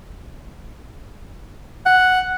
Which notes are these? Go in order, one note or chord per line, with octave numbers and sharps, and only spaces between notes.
F#5